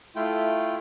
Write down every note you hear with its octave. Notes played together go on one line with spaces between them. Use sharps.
A3 E4 F4 G5